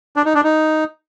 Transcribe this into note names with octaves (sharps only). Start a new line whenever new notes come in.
D4
D#4
D4
D#4